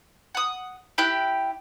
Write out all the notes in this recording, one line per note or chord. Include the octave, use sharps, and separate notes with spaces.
F#5 D#6
E4 G4 G5 F#6